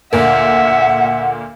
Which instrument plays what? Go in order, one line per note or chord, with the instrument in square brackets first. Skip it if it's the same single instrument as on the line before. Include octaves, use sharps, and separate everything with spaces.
[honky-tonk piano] D2 A#2 A#4 [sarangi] E5 [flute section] F#5